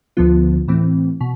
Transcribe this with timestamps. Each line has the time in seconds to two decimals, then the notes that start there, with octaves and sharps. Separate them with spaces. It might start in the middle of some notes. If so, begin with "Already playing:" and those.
0.17 D2 D3 F3 B3 F4
0.68 A2 E3 A3 C4
1.21 B2